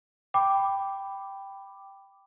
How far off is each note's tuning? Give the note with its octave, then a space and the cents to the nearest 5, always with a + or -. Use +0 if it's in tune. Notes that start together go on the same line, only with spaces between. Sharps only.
G5 +0 B5 +5 D6 +0